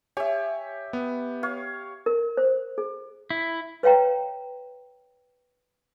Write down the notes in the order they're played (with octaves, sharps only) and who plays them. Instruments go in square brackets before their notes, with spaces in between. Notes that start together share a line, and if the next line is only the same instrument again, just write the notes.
[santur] G4 E5 [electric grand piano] C#5 G#5
[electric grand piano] B3
[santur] C#5 F5
[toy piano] A#4
C5
G#4
[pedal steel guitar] E4
[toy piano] B4 C#5 F5 G5 A#5